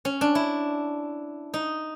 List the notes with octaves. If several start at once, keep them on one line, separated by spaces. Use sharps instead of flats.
C#4
D4
E4
D#4